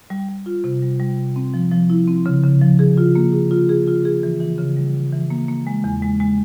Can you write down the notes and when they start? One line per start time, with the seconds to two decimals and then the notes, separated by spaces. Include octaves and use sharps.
0.10 G3
0.29 G3
0.46 F4
0.64 C3
0.82 G3
1.00 G3
1.18 C3
1.36 C4
1.54 F3
1.72 F3
1.90 E4
2.08 C4
2.26 C#3
2.44 C#3
2.62 F3
2.79 G#4
2.97 F4
3.15 A#3
3.33 G#4
3.51 F4
3.69 G#4
3.88 F4
4.05 G#4
4.23 E3
4.40 E3
4.58 C#3
4.77 G3
4.94 C#3
5.13 E3
5.30 A#3
5.48 A#3
5.67 G#3
5.84 E2
6.02 G#3
6.20 G#3